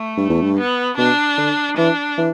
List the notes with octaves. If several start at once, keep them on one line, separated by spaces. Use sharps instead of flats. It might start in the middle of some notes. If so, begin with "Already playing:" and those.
Already playing: A3
G2
E2
G2
B3
B2 D4
D3
E3 D4
E3